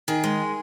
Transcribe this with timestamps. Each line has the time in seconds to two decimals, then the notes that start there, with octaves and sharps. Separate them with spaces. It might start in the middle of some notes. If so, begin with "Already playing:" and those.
0.08 D#3 G#4
0.24 G#3